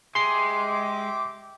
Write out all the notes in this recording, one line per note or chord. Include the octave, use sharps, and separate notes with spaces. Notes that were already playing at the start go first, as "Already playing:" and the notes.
G#3 G4 E5 C6 D6 C7